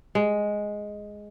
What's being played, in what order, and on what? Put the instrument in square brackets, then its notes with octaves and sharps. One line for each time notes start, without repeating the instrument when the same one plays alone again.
[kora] G#3